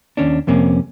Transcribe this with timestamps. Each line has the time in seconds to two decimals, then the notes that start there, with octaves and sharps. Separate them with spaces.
0.17 D#2 C#4 D4
0.47 F2 C3 A#3 C#4